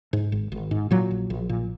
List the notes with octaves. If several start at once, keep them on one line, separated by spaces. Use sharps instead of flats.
G#2
G#1
G#1
G#2
A#2 F#3
A#1
A#1
A#2